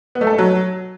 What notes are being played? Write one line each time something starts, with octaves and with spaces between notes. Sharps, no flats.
B3
A3
A4
A3
F#3